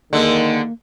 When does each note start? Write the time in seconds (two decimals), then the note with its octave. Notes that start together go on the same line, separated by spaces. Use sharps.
0.13 D3 D#3 G#3 A#3